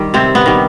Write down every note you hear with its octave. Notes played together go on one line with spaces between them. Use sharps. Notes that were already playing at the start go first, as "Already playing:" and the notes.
Already playing: D#3 G3
C3 C4
B3
D#3 G3